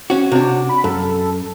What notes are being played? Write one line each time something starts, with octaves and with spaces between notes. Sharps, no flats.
C#4 F#4
C3 D4 F#4
B5
F#2 A4